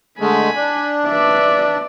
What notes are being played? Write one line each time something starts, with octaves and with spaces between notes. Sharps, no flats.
D3 G#3 A3 G#5 B5
D4
B4 D5 E5